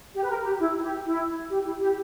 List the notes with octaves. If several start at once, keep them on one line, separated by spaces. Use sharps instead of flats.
G4
B4
A#4
G4
E4
G4
E4
G4
E4
G4